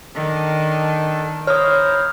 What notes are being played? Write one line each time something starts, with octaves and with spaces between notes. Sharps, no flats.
D#3 D4 A4
E4 C5 C#5 A#5 D#6 F6